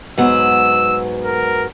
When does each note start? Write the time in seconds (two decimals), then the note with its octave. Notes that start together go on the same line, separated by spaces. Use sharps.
0.18 G#2 F#3 B3 E6
1.25 A#4